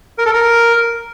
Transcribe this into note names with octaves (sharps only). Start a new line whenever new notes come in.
A#4
A4
A#4